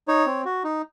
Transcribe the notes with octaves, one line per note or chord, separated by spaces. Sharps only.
D#4 C#5
C4
F#4
D#4